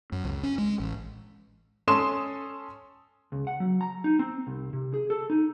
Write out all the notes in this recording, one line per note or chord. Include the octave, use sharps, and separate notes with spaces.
F#2
C#2
C#4
G#3
A1
C#4 A4 C6 D#6 E7
C#2
F#5
F#3
A#5
D#4
C4
C2
C3
G#4
A4
D#4